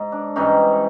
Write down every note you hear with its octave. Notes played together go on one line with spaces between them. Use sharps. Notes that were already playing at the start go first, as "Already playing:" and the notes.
Already playing: G#2
D4
G#2 E3 G3 C#4 D#4